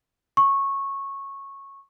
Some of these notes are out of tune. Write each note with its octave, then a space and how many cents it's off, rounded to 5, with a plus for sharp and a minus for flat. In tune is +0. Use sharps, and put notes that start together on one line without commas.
C#6 -15